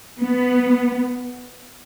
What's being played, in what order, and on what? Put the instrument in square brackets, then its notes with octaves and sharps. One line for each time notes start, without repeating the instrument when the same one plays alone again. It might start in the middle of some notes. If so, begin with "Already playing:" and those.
[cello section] B3